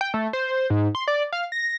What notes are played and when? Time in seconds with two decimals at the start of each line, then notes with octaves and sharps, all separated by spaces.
0.01 G5
0.14 A3
0.33 C5
0.70 G#2
0.95 C6
1.08 D5
1.33 F5
1.52 A#6